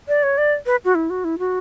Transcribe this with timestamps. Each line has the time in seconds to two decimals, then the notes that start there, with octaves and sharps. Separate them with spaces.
0.08 D5
0.23 C#5
0.38 D5
0.66 B4
0.85 F#4
0.95 E4
1.10 F#4
1.24 E4
1.39 F#4